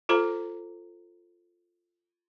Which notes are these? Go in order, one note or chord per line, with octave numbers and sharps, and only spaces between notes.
F4 A4 C5 A#5